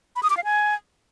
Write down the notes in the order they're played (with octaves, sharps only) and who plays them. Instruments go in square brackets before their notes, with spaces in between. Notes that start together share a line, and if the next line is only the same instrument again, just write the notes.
[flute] B5
D#6
D6
F5
G#5